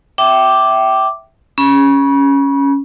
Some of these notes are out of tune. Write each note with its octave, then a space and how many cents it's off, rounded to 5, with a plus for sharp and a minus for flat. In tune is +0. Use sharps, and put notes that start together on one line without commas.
E5 +0 G5 -25 D6 +0
C#4 +0 B5 -35